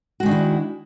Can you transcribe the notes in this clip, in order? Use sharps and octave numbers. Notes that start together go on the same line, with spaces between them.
D#3 G#3 D4 E4 F#4